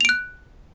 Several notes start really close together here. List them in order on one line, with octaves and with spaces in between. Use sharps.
F7 D7 F#6